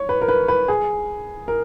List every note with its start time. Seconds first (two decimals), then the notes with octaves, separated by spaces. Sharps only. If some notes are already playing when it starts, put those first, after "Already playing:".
Already playing: C#5
0.09 B4
0.21 A#4
0.28 B4
0.48 B4
0.68 G#4
1.48 A#4